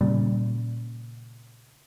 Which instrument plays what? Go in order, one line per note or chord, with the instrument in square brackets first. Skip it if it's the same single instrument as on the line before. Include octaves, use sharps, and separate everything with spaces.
[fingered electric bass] A#2 C#3 [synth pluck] G3